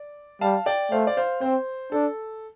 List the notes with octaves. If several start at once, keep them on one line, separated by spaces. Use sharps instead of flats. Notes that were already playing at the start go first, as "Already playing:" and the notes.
Already playing: D5
G3 F5 A5
D5 G5
A3 C5 F5
D5
C5 F5
C4 C5
D4 A4